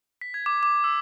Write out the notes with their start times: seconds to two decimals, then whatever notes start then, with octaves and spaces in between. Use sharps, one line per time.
0.21 B6
0.34 G#6
0.46 D6
0.63 D6
0.84 E6